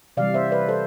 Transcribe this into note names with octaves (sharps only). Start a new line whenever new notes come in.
C3 E3 G3 D5 F5
C5 E5
B4 D5
A4 C5